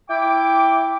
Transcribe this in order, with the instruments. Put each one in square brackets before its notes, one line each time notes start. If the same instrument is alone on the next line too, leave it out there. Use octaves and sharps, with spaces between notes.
[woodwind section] E4 G5 D6